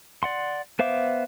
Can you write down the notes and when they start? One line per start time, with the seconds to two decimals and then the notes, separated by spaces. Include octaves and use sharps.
0.23 D5 F#5 C6
0.79 B3 C5 E5 F5 D6